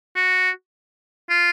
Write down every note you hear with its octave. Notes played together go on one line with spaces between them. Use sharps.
F#4
F4